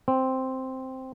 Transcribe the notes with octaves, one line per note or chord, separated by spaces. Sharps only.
C4